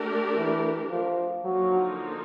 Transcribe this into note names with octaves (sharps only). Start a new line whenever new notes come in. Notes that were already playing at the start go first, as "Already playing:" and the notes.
Already playing: A3 D4 G4 A#4
E3
F3
D3 F3 F#3 A#3 D#4